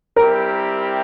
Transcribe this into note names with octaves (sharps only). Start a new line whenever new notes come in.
G3 C4 E4 G4 A#4